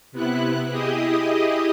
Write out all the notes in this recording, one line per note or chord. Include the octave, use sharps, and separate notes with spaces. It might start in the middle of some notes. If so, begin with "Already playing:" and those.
C3 B3 E4 F#6
E4 G4 G#4 D#5 D#6